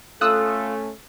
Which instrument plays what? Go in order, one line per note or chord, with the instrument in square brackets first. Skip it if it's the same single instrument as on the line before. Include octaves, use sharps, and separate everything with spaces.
[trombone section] A3 C#4 [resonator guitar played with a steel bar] F4 [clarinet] A4 [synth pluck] D#6 E6 F#6